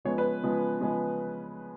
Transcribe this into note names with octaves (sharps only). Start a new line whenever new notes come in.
C#3 F3 G#3 B3 C#5
B4
C#3 F3 G#3 B3
C#3 F3 G#3 B3